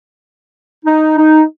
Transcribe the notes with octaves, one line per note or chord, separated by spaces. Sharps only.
D#4
D#4